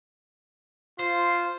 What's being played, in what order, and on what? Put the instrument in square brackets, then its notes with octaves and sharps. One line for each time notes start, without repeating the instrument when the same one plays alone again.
[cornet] F4 [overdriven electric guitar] C5